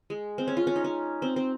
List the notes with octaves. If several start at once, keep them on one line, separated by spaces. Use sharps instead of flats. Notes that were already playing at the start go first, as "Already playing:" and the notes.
G#3
C4
C#4
F4
C#4
D#4
C#4
C4
C4